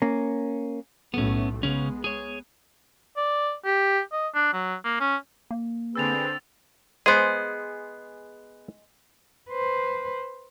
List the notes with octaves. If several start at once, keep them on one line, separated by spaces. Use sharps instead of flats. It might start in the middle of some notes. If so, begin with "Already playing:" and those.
A#3 C#4
B1 A2 A3 B3 C#4
C#3 G#3 B3 C#4
G#4 C#5
D5
G4
D#5
D4
F#3
A#3
C#4
A#3
D3 C4 G#4 B4 E6 A6 F7
G#3 B3 G#4 C5
B4 C5